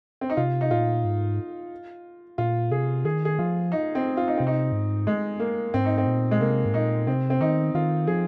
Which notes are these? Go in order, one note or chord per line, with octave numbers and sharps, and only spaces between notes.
C4
D#4
C3 F4
D#4
A#2 F4
G#2
A#2 F4
C3 G#4
D#3 G#4
G#4
F3 F4
D#4
C4
F4
D#4
C3 C4
D#4
G#2
G#3
A#3
G#2 C4
D#4
C4
A#2
G#3
C3 A#3
G#2
A#2 D#4
C3 C4
C4
D#3 D#4
D#3 F4
F3 G#4